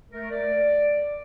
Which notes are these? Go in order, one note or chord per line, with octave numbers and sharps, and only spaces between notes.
A3 A#4
D5